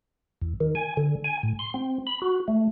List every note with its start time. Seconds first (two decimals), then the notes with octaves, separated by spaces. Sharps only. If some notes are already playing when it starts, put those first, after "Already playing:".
0.42 E2
0.60 D#3
0.75 G#5
0.97 D3
1.24 G#5
1.43 A2
1.59 C6
1.74 C4
2.07 B5
2.22 F#4
2.48 A3